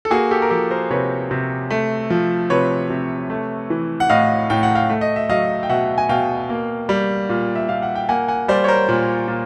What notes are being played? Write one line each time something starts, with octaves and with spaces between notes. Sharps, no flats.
A4
A#3 F#4 G#4
G4 A4
A#4
F3 G4 A4
A#4 C5
C3 B4 C#5
C3
A3
F3
C3 B4 C#5
C3
A3
E3
F#5
A2 D#5 F5
A2 G5
F#5
F5 G5
A3
D#5
E5
F#3 D#5 F5
G5
B2 E5 F#5
G#5
B2 F5 G5
A#3
G3
A#2
E5
A#2 F5
F#5
G5
A#3 F#5 G#5
F#5 G#5
G3 C5 D5
C#5
A#4 C5
A#2
A#2